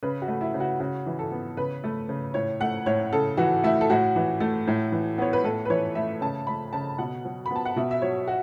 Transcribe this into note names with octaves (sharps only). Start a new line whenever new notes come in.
C#3 B4
F#4
A3
E4
C#3
F#4
C#3 F#4
E3
A4
B3
C#3 B4
A3
C#3
A2 C#5
A3 F#5
A2 C#5
C#3 A4
E3 F#4
A3 E4
A4
A2 F#4
E3
A3
A2
E3
B3 C#5
B4
A2 A4
B4
E3 C#5
A3 E5
C#3 A5
A3 B5
C#3 A5
B2 F#5
F#3
B5
B3 A5
F#5
B2 E5
E5
F#3 C#5
F#4